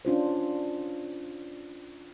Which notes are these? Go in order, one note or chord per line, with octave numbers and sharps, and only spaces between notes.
C#4 D4 F4 C5